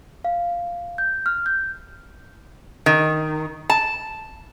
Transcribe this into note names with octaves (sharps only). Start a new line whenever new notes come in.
F5
G6
F6
G6
D#3
A5